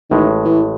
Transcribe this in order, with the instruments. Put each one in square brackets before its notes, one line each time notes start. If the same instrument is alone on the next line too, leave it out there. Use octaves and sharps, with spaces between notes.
[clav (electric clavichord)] A1 A2 G#3 [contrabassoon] D#3
[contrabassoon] E3